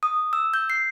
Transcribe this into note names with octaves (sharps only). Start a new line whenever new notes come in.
D#6
E6
G6
C7